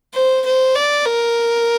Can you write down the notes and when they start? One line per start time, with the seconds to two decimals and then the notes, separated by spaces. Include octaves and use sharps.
0.14 C5
0.46 C5
0.75 D5
1.06 A#4